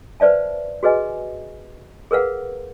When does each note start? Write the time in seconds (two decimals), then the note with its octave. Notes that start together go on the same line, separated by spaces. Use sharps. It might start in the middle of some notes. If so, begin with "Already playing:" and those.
0.20 B4 C5 D5 E5 A5
0.83 F#4 G#4 B4 D#5 G#5
2.11 G#4 A#4 B4 F5 F#5